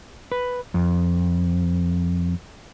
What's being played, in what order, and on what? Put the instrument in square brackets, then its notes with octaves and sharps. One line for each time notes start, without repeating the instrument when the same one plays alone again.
[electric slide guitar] B4
F2